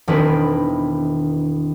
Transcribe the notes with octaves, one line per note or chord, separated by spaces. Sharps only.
E1 D#3 C4 D4 G#4 B4